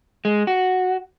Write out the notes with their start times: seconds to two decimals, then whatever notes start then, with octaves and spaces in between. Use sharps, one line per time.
0.25 G#3
0.47 F#4